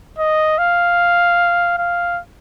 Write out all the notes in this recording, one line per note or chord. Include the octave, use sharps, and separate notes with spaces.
D#5
F5
F5